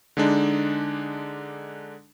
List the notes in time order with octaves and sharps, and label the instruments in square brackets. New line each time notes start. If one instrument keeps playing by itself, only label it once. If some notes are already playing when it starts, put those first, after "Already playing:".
[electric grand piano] D3 G#3 D4 D#4